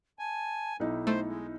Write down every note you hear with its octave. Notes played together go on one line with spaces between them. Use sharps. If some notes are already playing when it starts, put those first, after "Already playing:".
G#5 A5
B1 D#4 E4
A3 C5
G#3